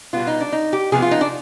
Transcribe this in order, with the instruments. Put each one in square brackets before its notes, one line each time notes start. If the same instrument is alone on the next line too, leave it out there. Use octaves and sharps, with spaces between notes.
[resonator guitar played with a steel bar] B2 G3 B3 F4
D#4
D4
D#4
G4
C3 F3 B3 G#4
F4
D#4
D4